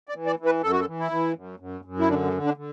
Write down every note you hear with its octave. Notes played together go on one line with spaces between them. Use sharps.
D5
E3
D5
E3
B4
F#2 A4
F#4
A4
E3
E4
E3
F#2
F#2
F#2
E4
D3 D4
A3
D3
D4
D3